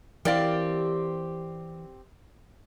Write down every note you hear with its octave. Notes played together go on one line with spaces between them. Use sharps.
E3 C4 G4 A#4 D5 F5